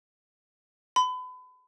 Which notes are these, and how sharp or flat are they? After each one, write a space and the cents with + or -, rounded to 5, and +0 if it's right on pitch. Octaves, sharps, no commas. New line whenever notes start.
B5 +35